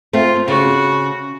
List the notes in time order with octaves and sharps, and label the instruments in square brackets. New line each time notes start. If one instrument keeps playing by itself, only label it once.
[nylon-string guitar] A3 C4 [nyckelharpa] F4
[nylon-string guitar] C#3 [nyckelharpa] F#4